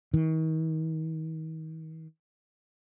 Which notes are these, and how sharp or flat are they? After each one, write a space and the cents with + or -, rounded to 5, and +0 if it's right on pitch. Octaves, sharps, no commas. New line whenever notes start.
D#3 +40